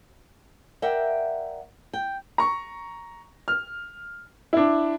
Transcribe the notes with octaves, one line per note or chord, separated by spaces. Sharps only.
A#4 D5 E5 F#5 G5
G5
A#5 C#6
F6
D4 E4